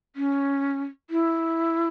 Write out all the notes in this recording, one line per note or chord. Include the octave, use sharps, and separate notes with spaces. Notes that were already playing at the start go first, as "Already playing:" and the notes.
C#4
E4